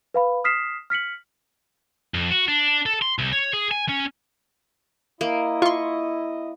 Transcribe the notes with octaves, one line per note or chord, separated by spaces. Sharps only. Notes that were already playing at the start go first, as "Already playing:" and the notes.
B4 F5 B5
D#6 F6 B6 C7 E7
F6 B6 C#7 F#7
F2
F#4
D4
A4
C6
C2
C#5
G#4
G#5
C#4
A#3 E4 D#5
F4 C6 C#6